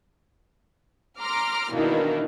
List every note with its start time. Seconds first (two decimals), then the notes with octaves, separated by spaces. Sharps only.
1.20 A#5 C6 D6 F6
1.71 B2 D#3 E3 A#3 D4 D#4